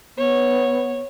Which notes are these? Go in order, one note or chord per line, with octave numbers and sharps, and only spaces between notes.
B3 C#5